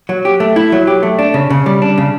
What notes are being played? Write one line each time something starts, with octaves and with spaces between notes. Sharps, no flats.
F#3
G4
A3
E4
F#3
G4
A3
D4
C#3
C#3
G3
D4
C#3